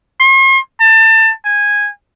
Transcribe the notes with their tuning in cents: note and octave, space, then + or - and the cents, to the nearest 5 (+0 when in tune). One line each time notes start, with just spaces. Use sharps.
C6 +45
A5 +25
G#5 -10